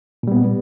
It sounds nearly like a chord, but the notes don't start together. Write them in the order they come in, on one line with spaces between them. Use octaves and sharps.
A#2 G3 B3